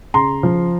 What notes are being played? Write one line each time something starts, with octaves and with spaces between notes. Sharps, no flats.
C#3 A#5 C6
F3